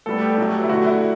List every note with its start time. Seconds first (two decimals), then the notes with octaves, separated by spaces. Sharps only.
0.06 A2 G3 B3 A4
0.22 G4
0.38 B2 F#3 A3
0.63 E4
0.69 D3 A3 F#4
0.86 E4